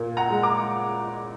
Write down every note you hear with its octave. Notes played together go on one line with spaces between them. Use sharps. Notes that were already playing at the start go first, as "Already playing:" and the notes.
Already playing: A#2
F#5 A#5
G#3
A#5 D6